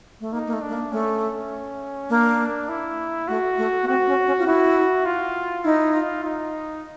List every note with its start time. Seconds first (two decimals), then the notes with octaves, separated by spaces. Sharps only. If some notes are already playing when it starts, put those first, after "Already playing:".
0.20 A3
0.33 A#3 D#4
0.47 A#3
0.53 A3
0.62 D4
0.68 A3
0.73 A#3
0.92 A3 C#4
2.10 A#3 D4
2.69 E4
3.28 A3 F#4
3.58 A3
3.83 B3
3.87 C4 F#4
4.07 C#4
4.27 C#4
4.39 F4
4.46 E4 F#4
5.06 F4
5.64 D#4 E4
5.94 F4
6.24 D#4